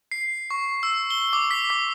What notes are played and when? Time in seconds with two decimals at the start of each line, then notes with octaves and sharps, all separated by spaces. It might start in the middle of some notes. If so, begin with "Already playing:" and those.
0.11 C7
0.51 C#6
0.83 E6
1.10 G7
1.33 D6
1.51 B6
1.70 D6